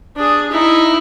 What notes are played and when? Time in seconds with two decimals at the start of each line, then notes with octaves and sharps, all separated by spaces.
0.16 D4 G#4
0.51 D#4 E4